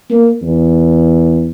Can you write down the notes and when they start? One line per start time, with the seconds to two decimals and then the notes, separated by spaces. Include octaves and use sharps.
0.10 A#3
0.42 E2